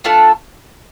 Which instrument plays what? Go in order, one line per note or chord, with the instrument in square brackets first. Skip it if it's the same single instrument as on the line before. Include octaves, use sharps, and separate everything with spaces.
[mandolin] A3 D4 F4 A4